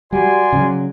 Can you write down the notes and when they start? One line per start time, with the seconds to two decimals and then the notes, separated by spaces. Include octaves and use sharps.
0.13 G3 F#4 D5 G#5 C6
0.53 C#3 E3 F#3